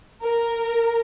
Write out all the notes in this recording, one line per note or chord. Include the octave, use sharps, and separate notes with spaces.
A#4